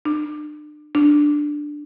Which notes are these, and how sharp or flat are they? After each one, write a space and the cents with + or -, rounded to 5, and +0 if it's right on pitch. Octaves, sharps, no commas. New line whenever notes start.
D4 +35
D4 +5